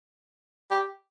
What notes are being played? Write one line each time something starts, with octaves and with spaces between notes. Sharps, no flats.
G4